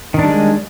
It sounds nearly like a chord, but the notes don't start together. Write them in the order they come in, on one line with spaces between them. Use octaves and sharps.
D#3 D4 G3 G#3